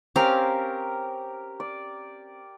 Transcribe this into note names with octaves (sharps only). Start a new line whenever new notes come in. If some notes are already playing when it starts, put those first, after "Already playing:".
C4 C#4 G4 A#4 F5
D5